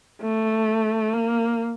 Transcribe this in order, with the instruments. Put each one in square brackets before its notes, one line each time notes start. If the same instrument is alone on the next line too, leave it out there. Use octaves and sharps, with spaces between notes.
[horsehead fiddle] A3
A#3